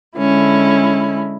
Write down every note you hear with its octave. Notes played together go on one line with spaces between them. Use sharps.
D3 G#3 C#4 E4